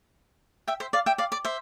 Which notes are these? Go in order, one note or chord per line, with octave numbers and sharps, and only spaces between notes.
E5 G5
C5 E5
D5 F5
E5 G5
D5 F5
D5
C5 E5